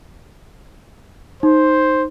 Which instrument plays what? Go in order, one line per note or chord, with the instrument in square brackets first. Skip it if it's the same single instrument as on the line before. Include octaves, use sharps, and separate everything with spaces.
[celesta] D#4 [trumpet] C5